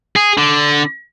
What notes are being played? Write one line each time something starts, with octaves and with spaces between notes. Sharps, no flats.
G#4
D3